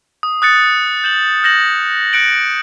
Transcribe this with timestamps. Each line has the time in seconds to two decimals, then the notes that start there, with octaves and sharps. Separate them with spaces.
0.23 D#6
0.42 D#6 F#6 A6 C#7
1.04 G6 E7 F#7
1.43 F6 G6 A#6 E7 F#7
2.13 F#6 C#7 D7 F#7